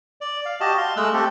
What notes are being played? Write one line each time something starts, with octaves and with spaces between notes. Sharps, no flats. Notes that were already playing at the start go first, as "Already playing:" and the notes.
D5
F5
F#4 G4 D#5 A5
F5 C6
G#3 A3 E6 F#6
A3 C4 G4 A4